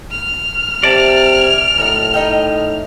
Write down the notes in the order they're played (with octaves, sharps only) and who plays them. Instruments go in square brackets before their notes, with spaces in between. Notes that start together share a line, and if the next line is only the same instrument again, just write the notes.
[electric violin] F6
[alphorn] C3 [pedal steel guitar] D5 A5
[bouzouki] G#5
[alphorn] A2 [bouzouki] D#4 F#4 A#4
[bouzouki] D#4 D#5 G5